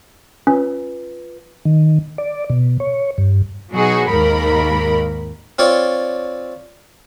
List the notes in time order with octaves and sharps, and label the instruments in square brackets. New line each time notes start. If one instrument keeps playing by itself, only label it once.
[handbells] C#4 [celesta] F4 B4
[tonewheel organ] D#3
D5
B2
C#5
G2
[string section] B2 F#3 D#4 F#4 G#4
D#2 G#2 A#4 B5
[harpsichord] C4 F4 C#5 D5